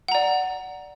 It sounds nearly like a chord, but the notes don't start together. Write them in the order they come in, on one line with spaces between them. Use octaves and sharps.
F#5 A#5 D5